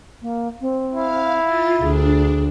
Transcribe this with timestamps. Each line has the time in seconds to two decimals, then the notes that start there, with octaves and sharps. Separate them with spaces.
0.22 A#3
0.61 C4
0.94 E4 F5
1.43 F4 A6
1.82 D2 D4 G#4